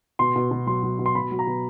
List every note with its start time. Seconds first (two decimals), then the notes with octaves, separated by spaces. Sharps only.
0.19 B2 C6
0.36 B2
0.51 B2
0.67 F#3 C6
0.83 F#3
0.99 B2
1.06 C6
1.15 B2 B5
1.31 F#3
1.39 A#5
1.47 B2